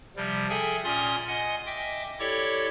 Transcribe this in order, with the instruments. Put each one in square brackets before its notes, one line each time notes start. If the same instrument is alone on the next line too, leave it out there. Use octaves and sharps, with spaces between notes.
[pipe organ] C3 F3 G3
G#4 A4 E5 G5 G#5
A#2 C#4 D5 G#5 C6 D#6
D#5 F#5 G#5 C6
D#5 E5 G5 D6
E4 G4 A4 C#5 D5 C#6